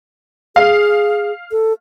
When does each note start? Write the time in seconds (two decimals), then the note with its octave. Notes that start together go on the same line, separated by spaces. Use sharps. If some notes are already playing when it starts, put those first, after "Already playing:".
0.56 G#4 F5
1.52 A4